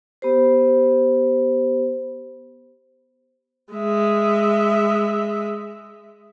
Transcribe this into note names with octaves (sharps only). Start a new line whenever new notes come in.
B3 G4 C5
G#3 E5